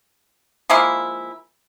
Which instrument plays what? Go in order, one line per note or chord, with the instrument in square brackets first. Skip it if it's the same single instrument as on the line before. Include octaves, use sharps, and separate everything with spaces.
[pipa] F3 G#3 A#3 E4